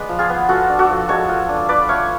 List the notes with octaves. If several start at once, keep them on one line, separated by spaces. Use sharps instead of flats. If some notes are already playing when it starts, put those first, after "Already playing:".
Already playing: G#3 B3 B4 D5
F3
F4 G#4
B3
F4 F#4 A4
D4
F#4 A4
F3
G#3 A4 C#5
F4
D4
F4 B4 D5
A3 C#5 F5